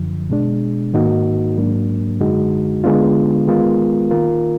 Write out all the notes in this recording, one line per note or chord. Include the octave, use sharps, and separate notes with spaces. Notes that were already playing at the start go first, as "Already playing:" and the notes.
Already playing: F#2 D3 F3
B2 G#3 D4
G#2 D#3 A#3 D#4 F#4
G#2 F#3 A#3 D4
F#2 D3 G#3 D#4 F#4
D3 G#3 B3 D4 F4
D#3 G#3 B3 F4 A#4
D#3 A#3 F4 A#4